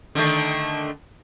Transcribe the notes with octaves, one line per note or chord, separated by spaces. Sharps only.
D3 D#3 A3